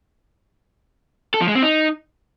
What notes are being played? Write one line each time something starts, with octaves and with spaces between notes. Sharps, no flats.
A4
F3
G#3
C4
D#4